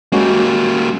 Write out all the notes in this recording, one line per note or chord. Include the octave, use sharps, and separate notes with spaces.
G3 G#3 A#3 C#4 F#4